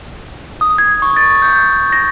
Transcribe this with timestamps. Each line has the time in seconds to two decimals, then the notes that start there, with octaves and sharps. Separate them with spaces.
0.61 D#6
0.78 G#6
1.02 C#6
1.16 A6
1.42 G6
1.92 A#6